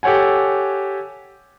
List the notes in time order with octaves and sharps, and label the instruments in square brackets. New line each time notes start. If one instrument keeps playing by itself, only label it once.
[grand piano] G4 A4 C#5 F#5 G#5